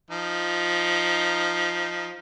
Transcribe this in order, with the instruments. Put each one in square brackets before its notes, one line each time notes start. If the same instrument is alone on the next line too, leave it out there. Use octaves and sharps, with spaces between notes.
[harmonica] F3 D#4